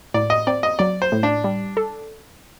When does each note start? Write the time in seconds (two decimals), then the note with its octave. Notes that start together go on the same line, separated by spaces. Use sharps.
0.14 A2 D5
0.30 D#5
0.47 C4 D5
0.63 D#5
0.79 F#3 D5
1.02 C5
1.12 A2
1.23 D4
1.44 G3
1.77 A4